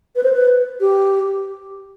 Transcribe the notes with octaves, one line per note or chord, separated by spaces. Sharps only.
B4
C5
B4
G4